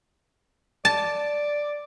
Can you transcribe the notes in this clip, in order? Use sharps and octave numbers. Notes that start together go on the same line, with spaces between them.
D5 A5